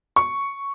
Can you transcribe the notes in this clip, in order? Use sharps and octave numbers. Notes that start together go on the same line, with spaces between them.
C#6